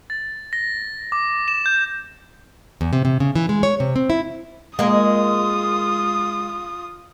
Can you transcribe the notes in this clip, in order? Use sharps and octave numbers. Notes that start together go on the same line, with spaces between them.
A6
A#6
D6
E7
G6
E2
C3
C3
C#3
E3
G#3
C#5
C3
C4
E4
G#3 A#3 F4 D#6